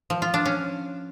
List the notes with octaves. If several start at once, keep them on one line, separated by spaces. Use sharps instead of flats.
F3
F4
D4
C#4